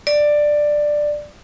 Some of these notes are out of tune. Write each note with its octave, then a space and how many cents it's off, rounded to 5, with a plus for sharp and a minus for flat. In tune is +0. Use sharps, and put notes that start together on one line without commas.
D5 +10